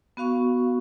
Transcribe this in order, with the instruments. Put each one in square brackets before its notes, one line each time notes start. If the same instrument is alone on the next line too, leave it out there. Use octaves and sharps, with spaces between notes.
[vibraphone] B3 F#4 F5 C#6